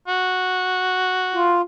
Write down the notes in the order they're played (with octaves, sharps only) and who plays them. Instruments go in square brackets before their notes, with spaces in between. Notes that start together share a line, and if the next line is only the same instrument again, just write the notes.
[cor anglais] F#4
[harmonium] F4